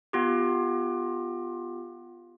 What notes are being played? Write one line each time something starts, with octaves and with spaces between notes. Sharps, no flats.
B3 F4 G4